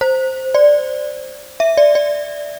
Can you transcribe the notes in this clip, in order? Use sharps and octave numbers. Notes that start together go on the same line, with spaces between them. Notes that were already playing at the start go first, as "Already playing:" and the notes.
C5
D5
E5
D5
D5